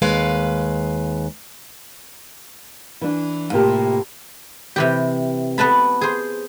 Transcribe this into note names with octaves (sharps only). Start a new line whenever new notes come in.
D#2 G#3 B4 F5
E3 D4
A2 C3 A#3 F4 G4 A5
C3 E3 G4
B3 B4 A5 B5
G#4 C5